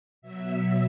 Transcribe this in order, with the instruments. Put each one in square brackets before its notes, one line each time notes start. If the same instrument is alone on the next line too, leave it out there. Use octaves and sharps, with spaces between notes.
[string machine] B2 F#3 E5